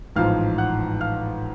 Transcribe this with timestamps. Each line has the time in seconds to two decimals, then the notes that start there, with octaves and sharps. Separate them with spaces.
0.16 A1 G#2 F3 F5 F6
0.58 F#5 F#6
1.01 F5 F6